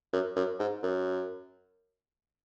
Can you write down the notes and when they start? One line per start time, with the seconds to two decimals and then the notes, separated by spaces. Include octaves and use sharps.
0.13 F#2
0.36 F#2
0.59 G#2
0.83 F#2